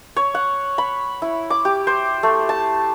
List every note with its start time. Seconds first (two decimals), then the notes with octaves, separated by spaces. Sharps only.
0.16 C#5
0.35 F#5
0.78 B5
1.22 E4
1.50 D6
1.65 G4
1.87 C5
2.23 A3
2.49 A5